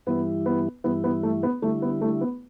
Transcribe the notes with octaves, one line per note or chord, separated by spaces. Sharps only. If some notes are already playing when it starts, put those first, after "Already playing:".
G2 E3 G3 B3 E4
B3
G2 E3 G3 B3 E4
B3
A3
B3
D3 G3 A3 E4
B3
A3
B3